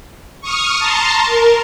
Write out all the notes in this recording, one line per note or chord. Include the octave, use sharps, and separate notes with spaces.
C#6 D#6 F6
A5 A#5 C6
A#4